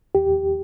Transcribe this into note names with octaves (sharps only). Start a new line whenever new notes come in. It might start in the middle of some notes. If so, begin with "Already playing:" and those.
D#2 G4